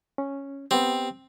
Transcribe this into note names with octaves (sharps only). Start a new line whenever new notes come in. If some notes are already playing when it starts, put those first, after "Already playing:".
C#4
B3 C4 G4